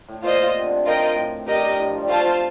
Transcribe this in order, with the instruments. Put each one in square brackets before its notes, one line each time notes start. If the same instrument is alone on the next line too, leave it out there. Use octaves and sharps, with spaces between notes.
[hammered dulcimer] A2
[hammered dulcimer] A#2 [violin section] F4 C5 D#5
[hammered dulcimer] C3
D3
C3
[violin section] F4 A#4 D#5 G5
[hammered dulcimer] A2
[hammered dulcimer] G2 [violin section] G4 A#4 D#5
[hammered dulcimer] G2
A2
F3
G3
[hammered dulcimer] A3 [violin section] F4 C5 F5 A5